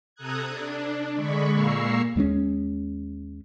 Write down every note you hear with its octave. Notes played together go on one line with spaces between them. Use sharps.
C3 A4 A#5 D#6 F#6 G#6
D4
D3 G#3 B5 C#6
A#2 A#3 A#5 C#6 E6 C7
D#2 G#3 A#3 C#4